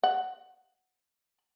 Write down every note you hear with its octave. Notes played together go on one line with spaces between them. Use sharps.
F#5